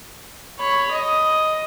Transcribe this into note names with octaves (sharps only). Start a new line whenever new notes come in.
C#5 B5
D#5